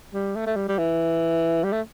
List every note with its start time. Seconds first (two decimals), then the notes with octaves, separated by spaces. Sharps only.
0.14 G3
0.36 A3
0.46 A3
0.56 G3
0.69 G3
0.78 E3
1.64 G3
1.72 A3